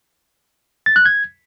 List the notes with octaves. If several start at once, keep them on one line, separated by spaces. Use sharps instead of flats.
A6
F#6
G#6